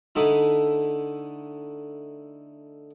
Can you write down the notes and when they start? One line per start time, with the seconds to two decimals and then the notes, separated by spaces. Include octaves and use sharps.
0.16 D3 A3 D#4 E4